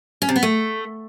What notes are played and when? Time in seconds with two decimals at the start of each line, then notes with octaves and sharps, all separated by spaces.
0.22 C#4
0.29 C3
0.36 B3
0.43 A3